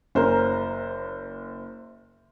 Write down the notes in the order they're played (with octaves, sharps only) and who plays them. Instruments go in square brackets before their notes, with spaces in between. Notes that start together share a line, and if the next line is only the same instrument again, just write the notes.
[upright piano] F#1 C5 [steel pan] C#4 A#4